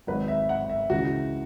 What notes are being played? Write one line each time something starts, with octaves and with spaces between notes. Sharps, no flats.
G#1 G#2 F#3 B4
E5
F#5
E5
C#2 C#3 E3 F#4